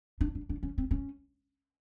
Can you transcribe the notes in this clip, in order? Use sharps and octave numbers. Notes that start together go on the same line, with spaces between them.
D4
D4
D4
C#4
C4
C#4